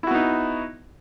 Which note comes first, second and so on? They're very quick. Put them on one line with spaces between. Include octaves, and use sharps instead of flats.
E4 F#4 B3 D#4